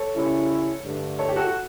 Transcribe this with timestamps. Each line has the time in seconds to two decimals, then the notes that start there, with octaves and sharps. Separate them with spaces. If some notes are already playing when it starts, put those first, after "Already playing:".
Already playing: A4 C#5
0.15 C#3 G3 C#4 E4
0.85 G2 D3 A3 D4
1.19 A4 C#5
1.28 G4
1.36 F#4 A4
1.46 F#4